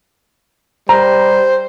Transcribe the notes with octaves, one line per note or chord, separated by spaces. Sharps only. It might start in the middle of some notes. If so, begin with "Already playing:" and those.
G3 C5 A#5